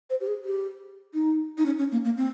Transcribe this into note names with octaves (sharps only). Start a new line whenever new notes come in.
C5
G4
G#4
G4
D#4
D#4
C#4
C#4
A#3
A#3
C4